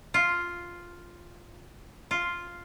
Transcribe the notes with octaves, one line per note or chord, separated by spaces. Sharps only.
F4
F4